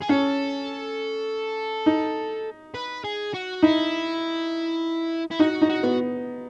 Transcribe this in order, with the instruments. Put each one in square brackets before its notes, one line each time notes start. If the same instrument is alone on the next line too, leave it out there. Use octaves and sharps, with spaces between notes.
[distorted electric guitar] G#4
[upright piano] C#4 [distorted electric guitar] A4
[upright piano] D#4
[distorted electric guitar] B4
G#4
F#4
[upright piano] D#4 [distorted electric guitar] E4
[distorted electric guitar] E4
[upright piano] D#4 [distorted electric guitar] F#4
[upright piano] D#4
[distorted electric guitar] F#4
[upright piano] B3